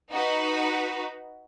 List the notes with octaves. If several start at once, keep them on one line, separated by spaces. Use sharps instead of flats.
D#4 F#4 B4